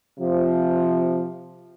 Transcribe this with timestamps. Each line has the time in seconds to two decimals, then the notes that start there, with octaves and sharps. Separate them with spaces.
0.19 C3 F3